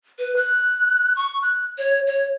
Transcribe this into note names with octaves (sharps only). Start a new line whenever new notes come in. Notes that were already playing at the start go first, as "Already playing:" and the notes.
B4
F#6
C#6
F#6
C#5
C#5